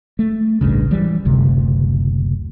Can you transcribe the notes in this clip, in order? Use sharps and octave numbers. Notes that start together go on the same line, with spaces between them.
A3
A1 D2 G2 C#3
E3 G3
F#1 D2 C3 A3